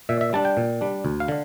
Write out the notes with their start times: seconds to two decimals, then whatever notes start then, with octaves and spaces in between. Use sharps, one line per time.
0.09 A#2 E5
0.21 E5
0.33 G3 D4 A5
0.45 G5
0.57 A#2
0.81 G3 D4
1.05 D2
1.20 F5
1.28 D3